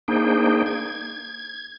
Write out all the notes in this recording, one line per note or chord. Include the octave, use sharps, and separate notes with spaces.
A#3 D4 D#4 G#4 C5 G5
G#6